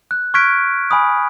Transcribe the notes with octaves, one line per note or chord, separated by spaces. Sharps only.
F#6
C#6 F6 F#6 G#6 B6 D7
G#5 B5 D#6